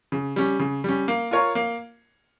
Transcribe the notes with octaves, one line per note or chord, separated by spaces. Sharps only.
C#3
G3 C#4
C#3
G3 C#4
A#3
F4 A#4 C#5
A#3